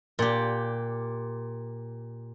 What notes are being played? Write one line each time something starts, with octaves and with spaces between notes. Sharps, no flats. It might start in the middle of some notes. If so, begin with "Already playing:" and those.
A#2 G4